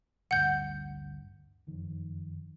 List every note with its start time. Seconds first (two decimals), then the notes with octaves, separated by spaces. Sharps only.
0.31 A1 D2 G2 F#5 G6
1.67 F#1 F2 D#3